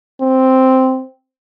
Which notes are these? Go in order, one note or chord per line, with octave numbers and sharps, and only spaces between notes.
C4